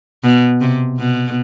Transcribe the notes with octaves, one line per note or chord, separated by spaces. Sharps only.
B2
C3
B2